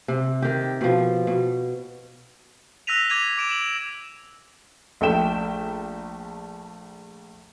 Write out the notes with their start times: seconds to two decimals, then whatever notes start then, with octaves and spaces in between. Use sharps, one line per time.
0.08 C3
0.42 D#3 G4
0.81 B2 F3
1.27 B2
2.87 E6 F#6 A#6 B6 D#7 F7
3.10 D6 G#6 B6 D#7 F7
3.38 D6 D7 E7
3.50 E7 F#7
5.01 A#1 A3 E5 G5 E7